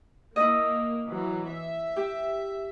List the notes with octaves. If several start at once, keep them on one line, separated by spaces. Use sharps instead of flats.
A#3 E4 D#5
E3 F#3
E5
G4